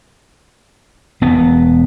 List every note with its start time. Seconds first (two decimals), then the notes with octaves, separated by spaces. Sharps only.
1.21 E1 B3